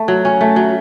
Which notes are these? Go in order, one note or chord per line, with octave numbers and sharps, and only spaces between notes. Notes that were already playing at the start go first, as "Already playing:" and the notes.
Already playing: A3
F#3
C#4
A3
F#3